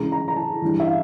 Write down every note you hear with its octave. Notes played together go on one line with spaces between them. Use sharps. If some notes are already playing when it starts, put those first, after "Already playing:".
Already playing: C#2 C#3 E3 A#5
A#5
A#5
A5
G2 E3
E5
F5